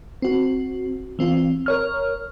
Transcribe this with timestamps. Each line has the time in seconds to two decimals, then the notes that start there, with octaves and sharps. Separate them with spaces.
0.22 C4 F#4
1.19 E3 C4 F4
1.66 A#4 C#5 F6